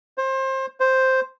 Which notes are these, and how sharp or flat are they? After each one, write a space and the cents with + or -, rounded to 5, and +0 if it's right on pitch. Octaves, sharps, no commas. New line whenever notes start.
C5 +25
C5 +0